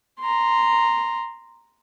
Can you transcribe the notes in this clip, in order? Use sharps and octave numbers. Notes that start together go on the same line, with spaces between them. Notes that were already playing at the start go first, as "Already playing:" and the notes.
A#5 C6